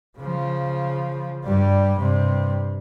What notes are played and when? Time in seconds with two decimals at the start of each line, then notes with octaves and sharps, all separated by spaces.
0.19 C#3 F3
1.45 G2 G3
2.00 G2 C3